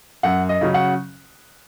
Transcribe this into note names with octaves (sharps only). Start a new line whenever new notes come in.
F#2 F#5
D#5
C#3 F#3 C#4
F#5